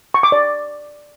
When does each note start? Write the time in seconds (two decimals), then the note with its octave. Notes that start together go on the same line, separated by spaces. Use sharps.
0.14 C#6
0.23 D6
0.32 D5